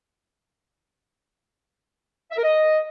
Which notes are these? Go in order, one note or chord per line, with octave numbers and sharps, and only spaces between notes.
E5
A#4
D#5